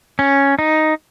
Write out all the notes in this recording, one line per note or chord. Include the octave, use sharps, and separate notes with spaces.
C#4
D#4